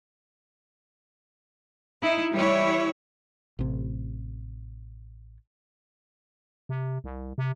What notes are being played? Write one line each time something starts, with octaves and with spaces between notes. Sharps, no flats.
D#4 E4
E3 G3 E4 C#5
A1 C3
C3
C2
C3